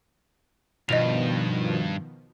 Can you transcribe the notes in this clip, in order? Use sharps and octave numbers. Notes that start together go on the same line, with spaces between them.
G2 B2 D#3 F3 D#5 F7